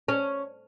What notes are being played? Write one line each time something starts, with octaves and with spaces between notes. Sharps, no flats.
C#4